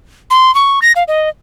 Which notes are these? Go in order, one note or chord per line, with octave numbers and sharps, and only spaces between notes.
C6
C#6
A#6
F5
D#5